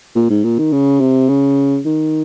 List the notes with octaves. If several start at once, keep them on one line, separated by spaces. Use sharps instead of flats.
A#2
G#2
A#2
D#3
C#3
C3
C#3
D#3